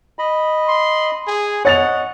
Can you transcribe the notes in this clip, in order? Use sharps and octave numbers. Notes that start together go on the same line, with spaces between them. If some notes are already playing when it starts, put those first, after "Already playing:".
D#5 B5
C6
G#4
C#5 D#5 F#5 A6 F7